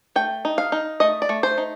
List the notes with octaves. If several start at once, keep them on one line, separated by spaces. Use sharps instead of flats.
A3 G5
D#4
F5
D#4
A3 D#5
D5
A3
C5
D#4